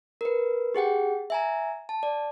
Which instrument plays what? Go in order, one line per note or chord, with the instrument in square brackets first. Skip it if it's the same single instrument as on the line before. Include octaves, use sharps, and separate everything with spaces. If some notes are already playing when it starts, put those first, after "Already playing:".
[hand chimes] A#4 B4
G4 G#4 F#5 G5
E5 G#5 A#5
A5
D5